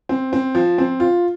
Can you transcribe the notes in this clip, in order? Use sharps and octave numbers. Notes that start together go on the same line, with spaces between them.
C4
C4
F3
C4
F4